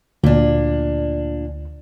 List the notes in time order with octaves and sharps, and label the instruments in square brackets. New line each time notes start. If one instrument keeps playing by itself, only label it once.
[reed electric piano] D2 [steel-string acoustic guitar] A#2 D4